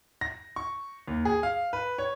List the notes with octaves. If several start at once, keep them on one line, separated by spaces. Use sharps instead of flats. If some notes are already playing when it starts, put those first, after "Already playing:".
A#6
C#6
D#2
G#4
F5
B4
C#5